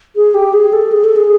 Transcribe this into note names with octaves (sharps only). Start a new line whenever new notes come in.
G#4
G4
G#4
A4
G#4
A4
G#4